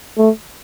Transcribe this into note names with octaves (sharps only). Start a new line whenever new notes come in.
A3